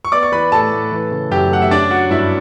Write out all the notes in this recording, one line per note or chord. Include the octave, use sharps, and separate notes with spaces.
C#6
B3 D5 D6
C#6
E3 B4 B5
A2 A4 A5
A2
E3
C#3
F#2 G4 G5
A3 F#5
E5
C#4 D4 D5
F#3 F#4 F#5
G2 E4 E5